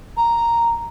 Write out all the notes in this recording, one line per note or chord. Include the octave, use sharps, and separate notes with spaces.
A#5